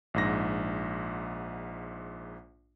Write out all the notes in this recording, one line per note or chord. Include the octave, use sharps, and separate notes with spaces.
A#1 G#2 A#6